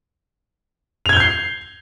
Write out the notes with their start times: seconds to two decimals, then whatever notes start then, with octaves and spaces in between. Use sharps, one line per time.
1.06 F7
1.09 G#6
1.13 G7
1.17 G6
1.20 C7